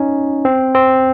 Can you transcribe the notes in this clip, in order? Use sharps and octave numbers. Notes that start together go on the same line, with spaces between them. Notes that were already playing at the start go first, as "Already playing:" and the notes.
Already playing: C#4 D#4
C4
C4